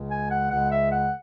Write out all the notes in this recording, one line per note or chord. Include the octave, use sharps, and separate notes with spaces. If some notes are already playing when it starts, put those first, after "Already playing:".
Already playing: C#2 C#3 G#3
G#5
F#5
C#2 C#3 G#3 F#5
E5
F#5